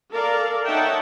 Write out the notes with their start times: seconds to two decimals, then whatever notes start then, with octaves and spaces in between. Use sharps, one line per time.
0.13 A4 A#4 D5 F5
0.66 D#4 C#5 E5 F#5 G5 A5